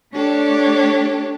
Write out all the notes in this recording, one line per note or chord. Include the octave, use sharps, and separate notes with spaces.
A3 D4 G4 A4 C#5